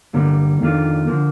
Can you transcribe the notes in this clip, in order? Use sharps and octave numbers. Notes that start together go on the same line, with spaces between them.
G2 D3 G3 A#3
F2 D#3 A#3 D4 F4
D3 F3 A#3